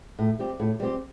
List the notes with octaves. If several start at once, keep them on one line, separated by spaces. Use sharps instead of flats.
A2
G3 C4 G4
A2
G3 C4 G4